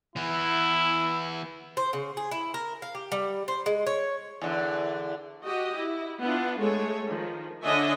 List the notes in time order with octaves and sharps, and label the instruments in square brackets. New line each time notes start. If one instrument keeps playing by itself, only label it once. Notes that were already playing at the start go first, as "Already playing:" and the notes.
[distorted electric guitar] E3 B3 [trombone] E4
[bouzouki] C5
C#3
G#4
E4
A#4
F5
G4
G3
C5
G#3
C#5
[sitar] E2 D3
[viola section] F#4 G4 D#5
E4
B3 D4 E4 F4
G#3 A3 G#4 A4 C#5
D#3 F3
D3 D4 C#5 D#5 E5 G#5